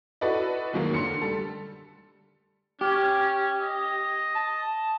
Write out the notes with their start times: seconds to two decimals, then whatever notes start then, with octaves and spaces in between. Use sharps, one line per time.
0.21 E4 F#4 A4 B4 D5 D#5
0.73 D#2 G#2 F#3 A#3
0.94 D3 C6 C#7
1.22 G3 A4
2.81 C#4 G4
3.61 D#5
4.35 A5